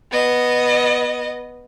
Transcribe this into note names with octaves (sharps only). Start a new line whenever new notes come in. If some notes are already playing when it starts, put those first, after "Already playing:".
B3 D#5